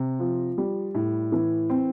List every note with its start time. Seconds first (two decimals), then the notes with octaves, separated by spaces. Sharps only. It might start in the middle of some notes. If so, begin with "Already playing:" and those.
Already playing: C3
0.20 F3
0.58 G3
0.95 A2
1.32 E3
1.70 C4